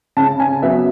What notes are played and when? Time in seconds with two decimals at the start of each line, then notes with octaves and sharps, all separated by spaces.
0.17 C#3 A5
0.40 G#5
0.62 F#3 B3 E5